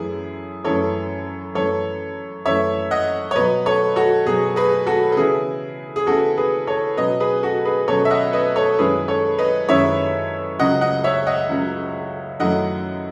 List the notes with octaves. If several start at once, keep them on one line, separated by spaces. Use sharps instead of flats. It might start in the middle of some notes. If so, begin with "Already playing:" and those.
Already playing: F#2 E3 A3 E4 G#4
F#2 E3 A3 E4 A4 C#5
F#2 E3 A3 A4 C#5
F#2 E3 A3 C#5 E5
D#5 F#5
C#5
B2 F#3 B3 B4 D#5
A4 C#5
F#4 A4
B2 F#3 B3 G#4
G#4 B4
F#4 A4
A4
C#3 E3 B3 E4 G#4
G#4
C#3 E3 B3 E4 F#4 A4
G#4 B4
A4 C#5
B2 F#3 C#4 B4 D#5
G#4 B4
F#4 A4
G#4 B4
B2 F#3 C#4 A4 C#5
E5
D#5 F#5
B4 D#5
A4 C#5
F#2 D#3 G#3 C#4 E4 G#4 B4
A4 C#5
B4 D#5
F#2 D#3 G#3 C#4 E4 C#5 E5
C#2 C#3 F#3 D#5 F#5
D#5 F#5
C#5 E5
D#5 F#5
C#2 C#3 F#3
F#2 D#3 F#3 A3 E4 D#5 F#5